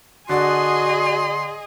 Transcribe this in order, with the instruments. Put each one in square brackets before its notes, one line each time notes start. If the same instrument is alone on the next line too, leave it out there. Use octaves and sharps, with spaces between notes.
[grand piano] D3 D5 [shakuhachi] F#4 [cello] G#4 D#5 [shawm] C6